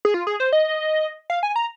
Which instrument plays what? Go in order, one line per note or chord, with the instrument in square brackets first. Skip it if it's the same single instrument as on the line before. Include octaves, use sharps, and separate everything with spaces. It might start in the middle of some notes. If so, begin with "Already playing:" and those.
[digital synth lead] G#4
F4
G#4
C5
D#5
F5
G#5
A#5